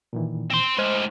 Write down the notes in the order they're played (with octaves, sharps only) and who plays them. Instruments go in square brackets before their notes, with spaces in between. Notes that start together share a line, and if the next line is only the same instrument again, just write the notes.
[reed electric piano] A#2 D#3 E3
[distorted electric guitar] C4 C6
[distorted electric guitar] A2 G#3 [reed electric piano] C5 F6